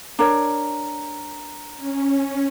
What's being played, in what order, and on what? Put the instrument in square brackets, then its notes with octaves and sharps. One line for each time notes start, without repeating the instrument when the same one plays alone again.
[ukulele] D4 A#4 C#5 [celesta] A#5
[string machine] C#4